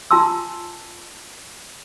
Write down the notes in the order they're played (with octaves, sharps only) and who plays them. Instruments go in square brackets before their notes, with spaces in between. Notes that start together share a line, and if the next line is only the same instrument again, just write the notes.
[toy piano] F4 G#5 A5 C6 E6